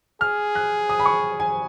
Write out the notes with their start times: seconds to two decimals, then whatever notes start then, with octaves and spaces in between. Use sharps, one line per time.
0.21 G#4 F6
0.55 F#6
0.89 D#6
1.00 B5
1.06 C#6
1.40 G#5